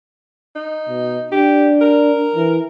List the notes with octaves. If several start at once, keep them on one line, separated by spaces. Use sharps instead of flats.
D#4
B2
D4 G4
A#4
E3